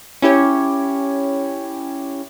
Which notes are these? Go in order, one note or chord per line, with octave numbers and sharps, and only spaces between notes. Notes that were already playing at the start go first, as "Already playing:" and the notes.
C#4 E4 G4 C#5